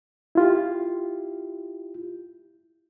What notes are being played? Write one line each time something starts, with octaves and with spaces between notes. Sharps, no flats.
E4 F4 G4